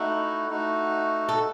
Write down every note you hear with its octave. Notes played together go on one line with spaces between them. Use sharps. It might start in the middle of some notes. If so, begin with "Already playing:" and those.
Already playing: A3 D#4 E4 F#4
A3 D#4 F#4
A4